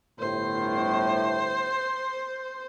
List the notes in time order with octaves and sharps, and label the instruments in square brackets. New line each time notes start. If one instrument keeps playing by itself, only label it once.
[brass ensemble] G1 A2 [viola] C5